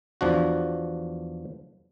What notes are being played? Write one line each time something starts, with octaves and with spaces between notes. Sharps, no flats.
E2 F3 D4 F#4